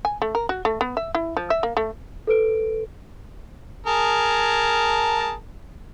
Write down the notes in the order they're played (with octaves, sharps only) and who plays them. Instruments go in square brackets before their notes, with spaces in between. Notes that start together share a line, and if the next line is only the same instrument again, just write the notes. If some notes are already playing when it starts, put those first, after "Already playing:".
[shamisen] G#5
A3
A#4
F#4
A3
B3
E5
E4
F3
E5
A#3
A3
[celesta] A4 B4 D7
[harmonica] G#4 A#4 A5